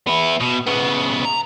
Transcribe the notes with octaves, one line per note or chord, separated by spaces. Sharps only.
B3 E4
B2
C#3 B3
A#5